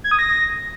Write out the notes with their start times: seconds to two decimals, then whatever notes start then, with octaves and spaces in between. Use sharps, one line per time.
0.04 G#6
0.11 D#6
0.19 A#6